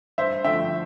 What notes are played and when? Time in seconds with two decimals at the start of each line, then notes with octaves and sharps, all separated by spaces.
0.18 G2 C5 E5
0.44 D3 F3 A3 E5 G5